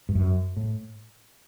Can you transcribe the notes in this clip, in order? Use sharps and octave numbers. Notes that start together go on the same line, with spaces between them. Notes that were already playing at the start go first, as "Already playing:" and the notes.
G2
F#2
A2